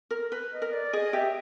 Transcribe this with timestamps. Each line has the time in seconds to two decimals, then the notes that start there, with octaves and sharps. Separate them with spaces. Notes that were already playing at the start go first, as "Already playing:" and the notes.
0.11 A#4
0.32 B4
0.52 D#5
0.62 A#4
0.73 D5
0.93 G#4 D#5
1.13 G4 E5